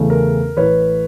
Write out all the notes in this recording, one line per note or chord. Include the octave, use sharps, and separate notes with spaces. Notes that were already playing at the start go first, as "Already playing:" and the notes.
Already playing: E2 C#3 E3 A3 C#4
A#4
A1 A2 E3 B4 C#5